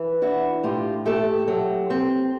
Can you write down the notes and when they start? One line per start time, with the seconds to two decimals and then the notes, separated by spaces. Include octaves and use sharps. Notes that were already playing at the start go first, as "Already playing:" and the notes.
Already playing: E3
0.22 D4 E4 F#4
0.63 A2 F4 G4
1.06 A3 G4 A4
1.48 F#3
1.90 C4